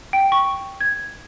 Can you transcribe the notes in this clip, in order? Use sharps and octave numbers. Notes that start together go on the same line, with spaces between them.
G5
C#6
G#6